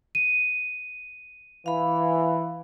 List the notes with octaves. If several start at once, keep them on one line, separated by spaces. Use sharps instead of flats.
D#7
E3 F5 B5